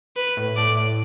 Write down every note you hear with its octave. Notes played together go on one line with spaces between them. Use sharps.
B4
A2
A2 D5
A2